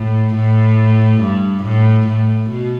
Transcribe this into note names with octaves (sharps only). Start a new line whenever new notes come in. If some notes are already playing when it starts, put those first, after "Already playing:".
Already playing: A2
A2
G2
A2
A2
B2